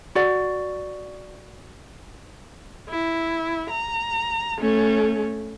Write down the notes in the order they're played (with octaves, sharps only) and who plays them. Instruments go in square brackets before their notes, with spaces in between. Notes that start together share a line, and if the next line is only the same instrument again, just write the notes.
[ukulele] F#4 D5 F#5
[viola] E4
A#5
A3 C#4